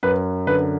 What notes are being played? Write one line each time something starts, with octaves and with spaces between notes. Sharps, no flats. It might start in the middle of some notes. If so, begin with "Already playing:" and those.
F#2 B4
D3 B4